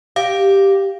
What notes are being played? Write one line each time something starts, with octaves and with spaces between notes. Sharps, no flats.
G4 F5